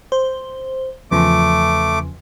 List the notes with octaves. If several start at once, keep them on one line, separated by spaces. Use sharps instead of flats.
C5
E2 C#3 F3 A3 D6